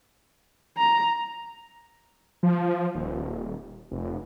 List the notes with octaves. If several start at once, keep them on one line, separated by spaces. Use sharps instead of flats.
A#5
F3
D#1
F1